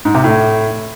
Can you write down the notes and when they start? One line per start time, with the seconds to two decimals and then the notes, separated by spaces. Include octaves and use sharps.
0.05 G#2
0.14 C3
0.24 A2